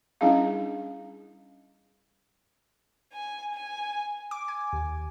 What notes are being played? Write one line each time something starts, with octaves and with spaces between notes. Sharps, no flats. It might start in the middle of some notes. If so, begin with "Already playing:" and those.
G3 C#4 D4 E4 G#4 F5
G#5
G#5
D6
G#5
D#2